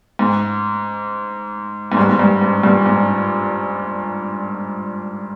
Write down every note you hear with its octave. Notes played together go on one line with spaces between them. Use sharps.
G#2
G#2
G2
G#2
G2
G#2
G2 A#2
G#2